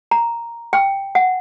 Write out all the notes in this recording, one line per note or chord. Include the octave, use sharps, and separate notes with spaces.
A#5
G5
F#5